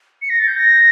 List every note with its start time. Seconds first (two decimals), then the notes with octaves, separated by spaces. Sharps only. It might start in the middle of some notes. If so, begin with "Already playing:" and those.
0.21 C#7
0.29 A#6
0.39 A6
0.47 G6
0.56 A#6